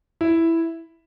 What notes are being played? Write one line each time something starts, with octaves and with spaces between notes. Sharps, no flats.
E4